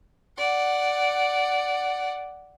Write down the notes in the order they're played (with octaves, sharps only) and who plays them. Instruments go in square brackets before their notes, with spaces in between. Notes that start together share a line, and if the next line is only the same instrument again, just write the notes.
[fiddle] D5 F#5